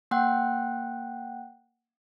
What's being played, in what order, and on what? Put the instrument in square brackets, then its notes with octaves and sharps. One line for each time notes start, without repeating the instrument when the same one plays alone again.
[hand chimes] A#3 F#5 G5 F#6